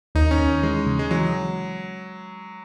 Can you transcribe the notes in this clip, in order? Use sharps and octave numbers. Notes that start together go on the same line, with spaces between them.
D#2 D#4
C#4
D#2
E3 G#3
C#3
G#3
E3 F#3